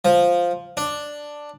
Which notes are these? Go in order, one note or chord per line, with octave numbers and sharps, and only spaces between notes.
F3
D4